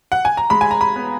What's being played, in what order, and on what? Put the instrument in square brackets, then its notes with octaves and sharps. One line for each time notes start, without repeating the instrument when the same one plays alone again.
[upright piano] F#5
G#5
A#5
G#3 B5
G#5
A#5
B5
B3